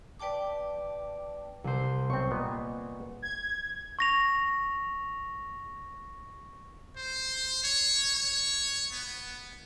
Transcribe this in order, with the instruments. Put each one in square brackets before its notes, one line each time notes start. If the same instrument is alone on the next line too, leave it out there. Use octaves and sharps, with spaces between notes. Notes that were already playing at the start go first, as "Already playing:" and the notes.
[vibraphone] B4 D5 G5 A5 D6
[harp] C2 C5
[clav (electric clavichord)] B1 C4 [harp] C#6
[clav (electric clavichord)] A#2 B3 D#5
[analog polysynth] G#6
[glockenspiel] C#6 A#6 F7
[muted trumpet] C5
C#5
C#5
B3